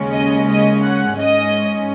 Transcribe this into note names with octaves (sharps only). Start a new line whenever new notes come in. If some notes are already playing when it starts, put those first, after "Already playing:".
Already playing: D#2 C#3 G#3 C#4
D#5
D#5
F#5
G#2 G#3 C#4 D#5